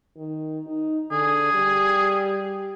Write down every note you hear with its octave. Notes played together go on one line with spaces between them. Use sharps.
D#3
D#4
D3 G#4
G3